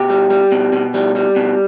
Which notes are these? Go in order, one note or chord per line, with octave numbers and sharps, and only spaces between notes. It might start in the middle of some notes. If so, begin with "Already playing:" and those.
Already playing: B2 G4
G3
G3
B2
B2
G3
G3
B2